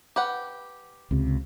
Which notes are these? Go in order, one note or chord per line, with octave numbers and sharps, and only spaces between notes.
G4 B4 F#5
C#2 C3